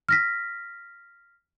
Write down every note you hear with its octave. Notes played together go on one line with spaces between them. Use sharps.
F6 A#6 B6